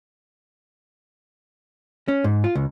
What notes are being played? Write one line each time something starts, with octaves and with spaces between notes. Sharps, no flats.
C#4
G#2
F4
C#2